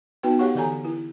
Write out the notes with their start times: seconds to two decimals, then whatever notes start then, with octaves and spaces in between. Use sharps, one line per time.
0.23 B3 D#4 F#4 B4 G5
0.39 G4 C#5 F5 F#5 C#6
0.55 D3 E3 G4 A4 G#5 A#5
0.85 E4